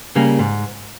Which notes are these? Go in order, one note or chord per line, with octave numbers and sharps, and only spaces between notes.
C#3 G3 A#3
G#2